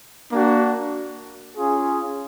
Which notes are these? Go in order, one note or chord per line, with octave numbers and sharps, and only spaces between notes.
A#3 D4 F#4
C#4 F4 G#4